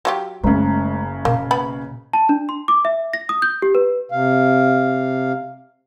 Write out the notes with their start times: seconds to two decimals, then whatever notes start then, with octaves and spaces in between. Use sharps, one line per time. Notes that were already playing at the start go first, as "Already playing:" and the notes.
0.05 F#3 F4 G4
0.43 F#1 C#3 G#3 A3
1.25 B2 A#3
1.51 B3 B5
2.13 A5
2.29 D4
2.49 C6
2.68 D6
2.85 E5
3.13 A#6
3.29 D#6
3.42 G6
3.62 G4
3.75 B4
4.11 C3 F5